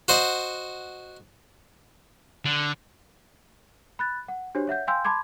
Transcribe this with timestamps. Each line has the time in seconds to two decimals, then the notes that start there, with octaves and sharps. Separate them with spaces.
0.08 F#4 C5 D#5 F#5
2.45 D3
3.99 B5 F#6 A6
4.28 F#5
4.55 D4 F#4 G4 C5 C#5
4.67 C#5 E5 F#5 G6
4.87 F5 G5 G#5 C6 E6 G6
5.05 A5 B5 C6 D6 G#6